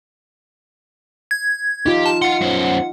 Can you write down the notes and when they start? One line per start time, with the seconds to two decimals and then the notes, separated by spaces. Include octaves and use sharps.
1.31 G#6
1.86 D#4 F4 G4
2.06 A5
2.22 F5 F#5 C6
2.41 F#2 C5